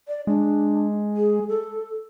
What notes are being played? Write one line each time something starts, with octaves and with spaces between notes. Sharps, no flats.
D5
G#3 D4
G#4
A4